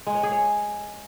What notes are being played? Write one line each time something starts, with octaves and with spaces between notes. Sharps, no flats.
G#3
C#5
G#4
C#5